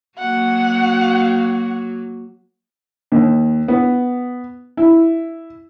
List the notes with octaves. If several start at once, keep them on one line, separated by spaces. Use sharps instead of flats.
F#3 A#3 F#4 F#5
D#2
B3
E4